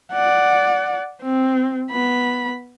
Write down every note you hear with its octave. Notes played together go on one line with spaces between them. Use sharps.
D5 F#5
C4
B3 B5